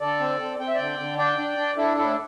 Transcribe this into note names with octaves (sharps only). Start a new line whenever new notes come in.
D3 A4 D5
C4
C4
C4 G5
E5
D3 D5 G5
D3
D4 D5 G5
D4
D4
D4 E4 A4
A2 E4 A4